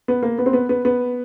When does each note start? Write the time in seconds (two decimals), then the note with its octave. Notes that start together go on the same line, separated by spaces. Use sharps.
0.08 B3
0.23 A#3
0.38 B3
0.46 C4
0.53 B3
0.69 B3
0.85 B3